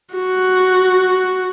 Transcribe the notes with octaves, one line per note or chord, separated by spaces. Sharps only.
F#4